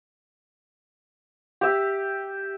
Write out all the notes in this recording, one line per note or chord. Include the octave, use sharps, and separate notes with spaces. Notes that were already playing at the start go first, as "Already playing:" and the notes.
G4 E5